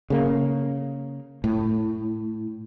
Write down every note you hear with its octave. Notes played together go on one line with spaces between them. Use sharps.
C#3 A#3
A2